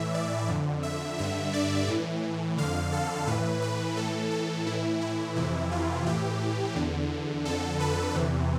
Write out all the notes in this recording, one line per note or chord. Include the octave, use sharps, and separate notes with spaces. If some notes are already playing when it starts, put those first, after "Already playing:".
Already playing: A2 E3 E5
D5
F2 D3
E5
G2 D3 E5
D5
A2 E3
F2 D3 F5
A4
A2 E3 B4
B4
A2 E3 A4
A4
A2 E3 E4
E4
F2 C3 E3 E4
F4
A2 E3 G4
E2 D3
F2 D3 A4
B4
E2 C3 E3